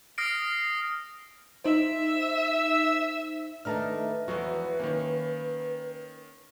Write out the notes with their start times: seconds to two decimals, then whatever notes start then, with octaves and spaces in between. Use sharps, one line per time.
0.18 D#6 F6 A#6 C7 D7
1.64 D#4 C5 E5
3.65 D#3 A3 D4 B4 A5 A#5 F6
4.28 E2 F3 F#3 F#4
4.80 D#3 A#3 C#4